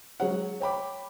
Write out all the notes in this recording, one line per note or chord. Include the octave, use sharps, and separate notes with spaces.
F#3 G#3 G#4 C#5 F#5
C#5 G5 B5 D6